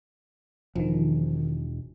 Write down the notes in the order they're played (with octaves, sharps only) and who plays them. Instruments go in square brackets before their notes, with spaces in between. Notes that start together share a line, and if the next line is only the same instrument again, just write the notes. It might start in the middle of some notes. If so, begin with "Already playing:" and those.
[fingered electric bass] E1 [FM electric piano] D#3 F3